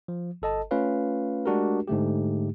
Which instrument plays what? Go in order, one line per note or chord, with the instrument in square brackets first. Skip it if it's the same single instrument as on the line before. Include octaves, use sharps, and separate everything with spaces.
[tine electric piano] F3
G1 A4 D#5 A5
A3 C#4 F4 B4 C#5 F5
G#3 A3 D4 F#4 G4 A#4
G#2 D3 A3 G4